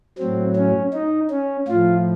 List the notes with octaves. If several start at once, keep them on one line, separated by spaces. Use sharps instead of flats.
A2 F#3 C4
C#4
D#4
C#4
A2 F3 F4